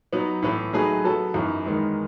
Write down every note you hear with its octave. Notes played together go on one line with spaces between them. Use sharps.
F#3 B3 D#4
A2 E3 B3
F#3 A3 D#4 G#4 B4
F#3 B3 F#4 A4
F#2 E3 B3 D#4
E2 D#3 G#3 B3 D#4